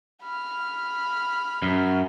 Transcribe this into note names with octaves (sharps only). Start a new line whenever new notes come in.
B5 F6
F#2